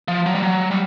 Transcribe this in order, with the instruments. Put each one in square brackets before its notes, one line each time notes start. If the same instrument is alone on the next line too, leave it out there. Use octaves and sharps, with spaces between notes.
[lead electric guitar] F3
F#3
G3
F#3
G3